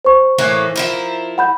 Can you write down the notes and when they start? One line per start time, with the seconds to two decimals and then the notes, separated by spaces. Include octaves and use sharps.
0.05 C5 C#6
0.38 A2 E3 A#3
0.76 F3 E4 A#4
1.38 F#5 B5 G6